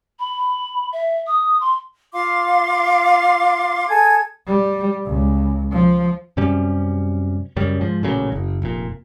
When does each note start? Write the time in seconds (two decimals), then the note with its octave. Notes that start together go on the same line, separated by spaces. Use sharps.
0.19 B5
0.93 E5
1.27 D#6
1.61 C6
2.13 F4 F5 C6 D6
3.88 G#4 A4 G#5 G#6
4.47 G3
5.06 C#2
5.72 F3
6.37 F#2 C3 G3 C#4
7.56 F#2 C#3 G3
7.81 G#2 F3
8.03 A1 A#2 C#3 F#3
8.32 F#1
8.62 F1 A#2